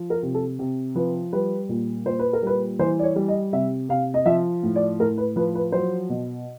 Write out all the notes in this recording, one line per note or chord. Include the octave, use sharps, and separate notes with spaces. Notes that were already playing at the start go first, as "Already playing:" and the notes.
Already playing: F3
A#4
C3
A4
C3
F3 B4
G3 B4
A#2
A#2 C5
B4
A#4
G3 B4
E3 C5
D5
C#5
G3
D#5
C3 E5
C3 F5
D#5
F3 E5
A2
D5
A2 A#4
B4
F3 B4
B4
F#3 C5
B2